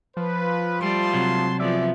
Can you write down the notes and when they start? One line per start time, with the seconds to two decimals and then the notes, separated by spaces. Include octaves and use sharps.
0.17 F3 B4
0.81 G3 A3 A5 C6
1.14 C3 F#3
1.60 F3 B3 G#4 D5 E5